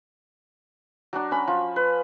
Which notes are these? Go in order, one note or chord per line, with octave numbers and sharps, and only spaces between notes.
F#3 D4
C#4 B5
F3
B4